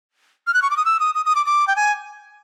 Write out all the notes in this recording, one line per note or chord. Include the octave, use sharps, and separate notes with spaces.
F6
F#6
C#6
D6
D#6
E6
D#6
D#6
D#6
D6
D6
G5
G#5